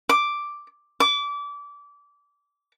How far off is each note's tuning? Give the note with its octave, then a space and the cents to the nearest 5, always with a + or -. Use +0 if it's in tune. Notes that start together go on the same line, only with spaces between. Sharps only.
D6 +0
D6 -25